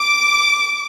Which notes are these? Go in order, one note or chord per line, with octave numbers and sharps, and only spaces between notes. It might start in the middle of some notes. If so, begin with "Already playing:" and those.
Already playing: D6